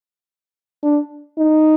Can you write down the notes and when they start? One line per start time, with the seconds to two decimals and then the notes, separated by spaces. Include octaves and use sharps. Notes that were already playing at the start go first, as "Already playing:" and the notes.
0.83 D4
1.38 D#4